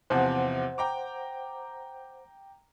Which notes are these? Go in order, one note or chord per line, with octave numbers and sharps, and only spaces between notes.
E2 C3 F3 C5 F#5
G5 A#5 D6